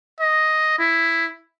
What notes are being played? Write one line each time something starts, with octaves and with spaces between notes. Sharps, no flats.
D#5
E4